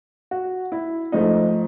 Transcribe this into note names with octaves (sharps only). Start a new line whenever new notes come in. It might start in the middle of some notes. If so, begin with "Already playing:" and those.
F#4
E4
G#2 F3 A3 D#4